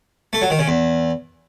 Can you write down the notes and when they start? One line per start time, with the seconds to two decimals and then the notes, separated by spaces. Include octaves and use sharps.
0.33 A3
0.42 F#3
0.50 D#3
0.59 C#3
0.68 E2